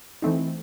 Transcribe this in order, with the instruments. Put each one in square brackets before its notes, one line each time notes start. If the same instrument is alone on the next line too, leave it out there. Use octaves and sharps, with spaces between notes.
[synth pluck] E3 A3 C4 D#4